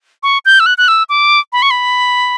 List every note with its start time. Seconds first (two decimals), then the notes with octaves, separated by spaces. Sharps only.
0.23 C#6
0.45 G6
0.60 E6
0.66 F#6
0.78 F#6
0.88 E6
1.09 D6
1.53 B5
1.62 C#6
1.71 B5